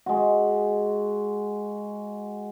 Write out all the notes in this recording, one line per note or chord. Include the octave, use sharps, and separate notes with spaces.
G#3 F#4